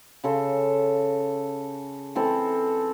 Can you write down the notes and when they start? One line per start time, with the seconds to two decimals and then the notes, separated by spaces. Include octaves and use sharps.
0.24 C#3 A4 C6
2.15 E3 C4 A4